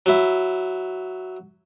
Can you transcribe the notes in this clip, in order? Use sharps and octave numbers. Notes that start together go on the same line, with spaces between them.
F#3 E4